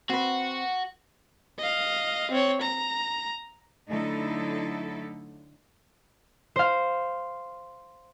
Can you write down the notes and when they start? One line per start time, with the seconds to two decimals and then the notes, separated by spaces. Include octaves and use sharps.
0.10 C4 F#4 B4
1.59 D#5 F5
2.32 C4 C#5
2.61 A#5
3.89 D3 F#3 A3 D#4 E4 A4
6.56 C5 F5